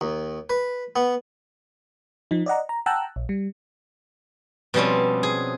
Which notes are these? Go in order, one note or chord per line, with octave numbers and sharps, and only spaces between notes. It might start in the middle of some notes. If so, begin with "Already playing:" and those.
D#2
B4
B3
F3 D#4
D5 D#5 F#5 A#5
A#5
F#5 G5 A5 A#5 E6 F#6
A#1
G3
B2 F3 G3 C4 C#4
G#4